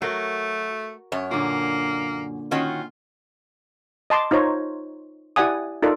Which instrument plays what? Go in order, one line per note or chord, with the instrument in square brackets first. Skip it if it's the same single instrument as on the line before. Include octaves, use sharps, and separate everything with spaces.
[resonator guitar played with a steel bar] F#3 [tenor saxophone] A3 [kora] F#4 A#4
[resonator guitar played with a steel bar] F#2 C#5
[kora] A#2 D3 [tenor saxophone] A#3
[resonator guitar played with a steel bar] D#3 C#4 F#4 [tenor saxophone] F4
[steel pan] D#5 A5 C6 D6
D#4 F4 C5 C#5 A#5
E4 G4 D5 F#5 G#5 D#6
D#4 F4 A4 A#4 D5